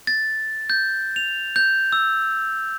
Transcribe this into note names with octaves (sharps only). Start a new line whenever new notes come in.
A6
G6
F7
G6
E6